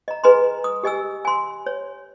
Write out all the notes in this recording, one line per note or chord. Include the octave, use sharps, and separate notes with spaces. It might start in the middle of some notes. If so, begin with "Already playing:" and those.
D#5 A#5
G#4 B4 D#5 G#5 A#5 C6
D#6
G4 D#5 G#5 E6
G#5 C6
C#5